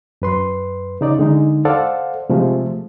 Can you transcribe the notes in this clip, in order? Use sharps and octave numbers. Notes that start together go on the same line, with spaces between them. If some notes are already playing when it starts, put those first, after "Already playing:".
F#2 B4 C6
C#3 D#4 D5
D3 G#3 D#4
A4 C5 D5 F5 F#5
C3 F3 G#3 A3